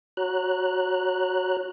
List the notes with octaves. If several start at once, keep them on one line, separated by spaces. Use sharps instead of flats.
F#4 C#5 A#5 F#6